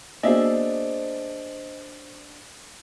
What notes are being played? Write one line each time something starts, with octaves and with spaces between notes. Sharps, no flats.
A#3 B3 D4 F#4 G#4 C5 D#5 E5